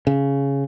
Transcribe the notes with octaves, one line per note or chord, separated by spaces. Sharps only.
C#3